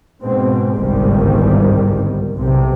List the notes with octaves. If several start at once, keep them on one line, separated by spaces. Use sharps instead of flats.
G#2 B2 C4
G1 C2 G#2 C3 D#3 G3
B1 C3